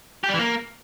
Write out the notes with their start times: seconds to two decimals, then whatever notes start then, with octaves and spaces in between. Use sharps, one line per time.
0.24 G4
0.29 G3
0.34 E3
0.39 A#3